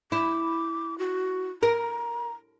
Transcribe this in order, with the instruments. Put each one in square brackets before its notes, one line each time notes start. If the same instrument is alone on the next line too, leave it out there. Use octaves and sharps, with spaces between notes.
[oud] E4 [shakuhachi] D6
[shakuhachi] F#4
[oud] A#4 [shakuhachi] A#5